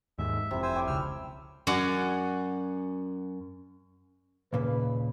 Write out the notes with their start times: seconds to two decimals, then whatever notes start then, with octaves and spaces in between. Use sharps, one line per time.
0.18 D#2 G#2 E5
0.51 F1 C3 E4
0.63 C5 G#5 E6
0.76 C#5 D5 G5
0.87 E1 C#2 C#3 E6 F6
1.67 F#2 C#4 F#4 D5 F#5
4.53 D#2 A#2 C#3 B4